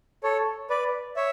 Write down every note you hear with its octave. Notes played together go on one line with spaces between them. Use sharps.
A4 C#5
B4 D5
C#5 E5